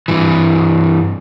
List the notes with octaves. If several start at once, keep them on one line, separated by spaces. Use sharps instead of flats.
G2 E3